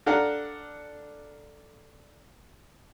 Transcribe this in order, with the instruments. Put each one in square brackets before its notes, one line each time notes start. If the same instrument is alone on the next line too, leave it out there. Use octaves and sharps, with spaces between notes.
[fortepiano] D4 A4 F5 F#5 A#5